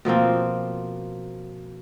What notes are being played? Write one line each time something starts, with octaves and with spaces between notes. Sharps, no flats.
B2 F3 A#3 C4